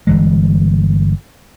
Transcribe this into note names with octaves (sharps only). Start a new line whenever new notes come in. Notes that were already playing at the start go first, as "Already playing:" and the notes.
G1 E3 G#3